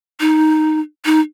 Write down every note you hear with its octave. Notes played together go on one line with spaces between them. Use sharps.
D#4
D#4